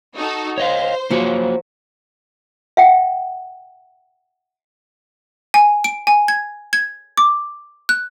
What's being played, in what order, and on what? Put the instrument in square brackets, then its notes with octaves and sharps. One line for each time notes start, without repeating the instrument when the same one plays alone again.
[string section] D#4 F#4 A4
[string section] C5 [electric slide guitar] C#5 D#5 F5
[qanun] F3 F#3 [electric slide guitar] A#3 F#4 C#5
[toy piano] E5 F#5 G5
[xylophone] G#5
D7
G#5
G#6
G#6
D6
F#6